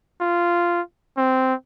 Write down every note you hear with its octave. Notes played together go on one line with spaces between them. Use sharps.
F4
C4